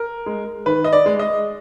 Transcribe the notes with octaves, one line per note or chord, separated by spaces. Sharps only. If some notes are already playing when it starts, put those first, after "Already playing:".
Already playing: A#4
G#3
D#3 B4
D#5
D5
G#3
D#5